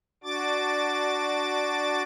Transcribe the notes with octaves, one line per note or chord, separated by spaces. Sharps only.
D4 F#4 D6 A6